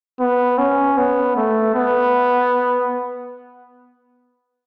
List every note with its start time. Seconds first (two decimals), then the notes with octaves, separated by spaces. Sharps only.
0.20 B3
0.59 C#4
0.98 B3
1.37 A3
1.75 B3